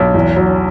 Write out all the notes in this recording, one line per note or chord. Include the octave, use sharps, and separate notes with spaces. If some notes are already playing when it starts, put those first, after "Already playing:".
Already playing: B1
E2
F#3